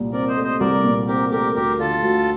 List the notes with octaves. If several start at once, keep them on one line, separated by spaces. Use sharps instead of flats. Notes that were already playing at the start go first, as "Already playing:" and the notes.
Already playing: C2 A#2
C4 A#4 D5
C5 D#5
A3
C5 D#5
C2 A#4 D5
A#2
C4 G4 A#4
A3 G4 A#4
D2 G4 A#4
D3 F4 A4
D2